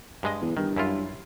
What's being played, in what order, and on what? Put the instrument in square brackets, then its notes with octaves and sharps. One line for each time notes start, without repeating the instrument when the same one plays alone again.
[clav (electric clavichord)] G2 G#3 D#5
[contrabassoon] E2
[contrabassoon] G2 [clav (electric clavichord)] D#3
[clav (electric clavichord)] F#2 E4 F4